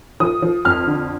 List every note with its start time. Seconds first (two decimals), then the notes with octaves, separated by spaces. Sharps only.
0.20 F3 D#6
0.42 F3
0.65 F2 F6
0.87 D3